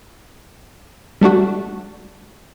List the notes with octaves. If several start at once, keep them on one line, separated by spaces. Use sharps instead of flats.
G3 A3 D4 F#4